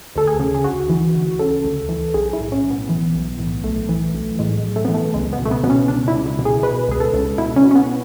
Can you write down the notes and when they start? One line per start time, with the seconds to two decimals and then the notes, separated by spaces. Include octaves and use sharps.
0.15 D2 A4
0.27 G#4
0.39 C#3
0.55 G#4
0.64 D2 F#4
0.89 E3
1.15 D2
1.39 C#3 A4
1.64 D2
1.89 E3
2.14 B1 G#4
2.33 E4
2.40 A2
2.52 C#4
2.64 B1
2.70 B3
2.89 E3
3.15 B1
3.39 A2
3.64 B1 A3
3.89 E3
4.14 B1
4.39 A2 G#3
4.64 B1
4.76 A3
4.85 E3 B3
4.94 A3
5.14 C#2 G#3
5.33 B3
5.39 B2
5.45 A3
5.51 B3
5.63 B2 B3
5.70 C#4
5.88 C#2 D4
6.08 E4
6.13 C#2
6.26 E4
6.39 B2
6.45 G#4
6.63 B2 B4
6.88 C#2 G#4
7.00 A4
7.14 C#2
7.38 B2 E4
7.56 C#4
7.63 B2
7.71 C#4
7.75 B3